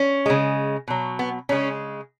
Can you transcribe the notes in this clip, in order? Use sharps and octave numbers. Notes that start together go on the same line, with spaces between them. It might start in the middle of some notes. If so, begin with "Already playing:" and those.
Already playing: C#4
C#3 G#3
B2 F#3
B3
C#3 G#3 C#4